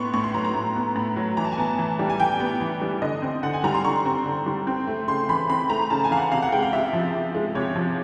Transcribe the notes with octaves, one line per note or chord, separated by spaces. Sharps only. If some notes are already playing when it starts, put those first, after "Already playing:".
Already playing: A2 B3 C6 C#6
A2 C#6
C6
F#3 A#5
A#5
A2
B3
A2
F#3
E3 A#5
A5
G#5
B3 A5
E3
G3
G#5
E3 G5
B3
E3
G3
D3 D#5
C4
D3 F#5
G#5
G3 A#5
C6
D3 C#6
C4
D3
G3
C4
A3
C#3 C6
E3 B5
C4 B5
A3 A#5
C#3 A5
G#5
E3 F5
F#5
C3 F5
F#5
G#3 G5
F5
C3 E5
F3
C3
G#3
C3 C#5
F3